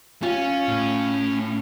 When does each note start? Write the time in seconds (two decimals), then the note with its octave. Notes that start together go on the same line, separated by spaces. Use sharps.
0.23 C#4 F4
0.68 A2